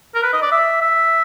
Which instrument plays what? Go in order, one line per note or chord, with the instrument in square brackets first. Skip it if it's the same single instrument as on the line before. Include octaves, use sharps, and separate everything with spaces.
[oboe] A#4
B4
D#5
D5
E5
E5